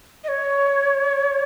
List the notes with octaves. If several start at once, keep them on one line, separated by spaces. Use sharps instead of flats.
D#5
C#5